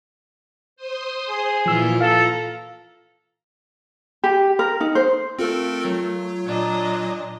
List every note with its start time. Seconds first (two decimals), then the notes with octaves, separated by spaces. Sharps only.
0.76 C5 C6 D#6
1.30 G#4
1.66 A#2 E3 F3 F4 E6
2.01 A4 F5 A#5
4.24 G4
4.59 A#4
4.81 D#4
4.95 C5
5.39 A3 C4 F4 A4 A#4
5.85 F#3
6.46 A#2 D4 D#5